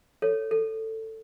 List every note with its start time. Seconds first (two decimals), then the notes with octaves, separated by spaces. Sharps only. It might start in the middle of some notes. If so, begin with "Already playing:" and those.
0.22 A4 C#5
0.51 A4